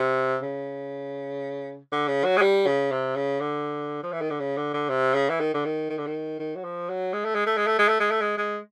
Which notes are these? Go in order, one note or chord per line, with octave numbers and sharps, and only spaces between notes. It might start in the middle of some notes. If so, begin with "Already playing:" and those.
Already playing: C3
C#3
D3
C#3
F#3
G#3
G3
C#3
C3
C#3
D3
F3
E3
D#3
D3
C#3
D3
D3
C3
C#3
E3
D#3
D3
D#3
D#3
D3
D#3
D#3
F#3
F3
F#3
G#3
A3
G#3
A3
G#3
A3
G#3
A3
G#3
A3
G#3
G#3